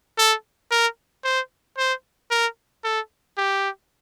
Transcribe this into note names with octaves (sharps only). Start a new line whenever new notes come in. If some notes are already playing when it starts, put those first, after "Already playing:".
A4
A#4
C5
C5
A#4
A4
G4